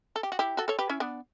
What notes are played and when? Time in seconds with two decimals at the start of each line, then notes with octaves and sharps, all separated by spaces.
0.16 A4
0.23 G4
0.32 F#4
0.39 E4 G4
0.57 F#4 A4
0.68 A4 C#5
0.79 G4 B4
0.89 C#4 E4
1.00 B3 D4